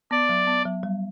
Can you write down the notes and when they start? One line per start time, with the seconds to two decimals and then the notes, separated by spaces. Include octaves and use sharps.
0.11 B3 D5
0.29 F#3
0.47 B3
0.65 F#3
0.83 G3